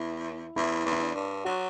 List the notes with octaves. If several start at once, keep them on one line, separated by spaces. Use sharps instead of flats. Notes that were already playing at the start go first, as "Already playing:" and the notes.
Already playing: E2 E4
E2 E4
E2
E4
D4
G2
F#3 F#4